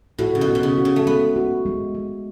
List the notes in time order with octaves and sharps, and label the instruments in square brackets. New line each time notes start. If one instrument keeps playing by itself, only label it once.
[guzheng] A2 [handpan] F#4
[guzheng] C#3
B2
[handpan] F#4
[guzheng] B2
C#3
[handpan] F#4
[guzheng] C#3
A3
[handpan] G#3 [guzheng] B3
[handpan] F#4
G#3
G#3